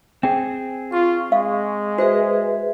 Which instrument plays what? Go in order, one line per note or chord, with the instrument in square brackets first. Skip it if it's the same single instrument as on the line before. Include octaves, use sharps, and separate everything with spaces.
[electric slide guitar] C4 G#4 [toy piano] G5
[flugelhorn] F4 [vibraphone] C#6
[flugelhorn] G#3 [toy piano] F5
[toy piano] F#4 C5 [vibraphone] G#4 B4 E5